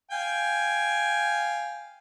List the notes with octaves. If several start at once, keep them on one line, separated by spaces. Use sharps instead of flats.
F5 G5 G#5